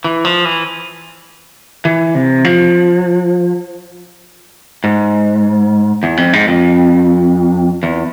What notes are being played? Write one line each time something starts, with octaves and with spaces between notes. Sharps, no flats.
E3
F3
E3
E3
C3
F3
G#2
E2
F2
G#2
F2
E2